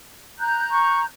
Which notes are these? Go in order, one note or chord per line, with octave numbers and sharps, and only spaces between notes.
A#5 F#6 G6
C#6